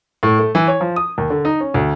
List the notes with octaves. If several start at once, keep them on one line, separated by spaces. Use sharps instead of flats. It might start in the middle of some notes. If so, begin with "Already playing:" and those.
A2
A3
E3
C#5
F3
D#6
D#2
D3
D#4
C#4
D2